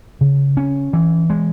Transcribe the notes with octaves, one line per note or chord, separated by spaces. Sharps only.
C#3
C#4
E3
G#3